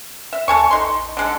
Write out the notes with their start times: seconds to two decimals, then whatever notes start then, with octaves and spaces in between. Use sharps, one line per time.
0.33 E5
0.48 D#2 A4 G#5 C#6
0.71 A1 D#4 C6
1.17 D3 G#3 A4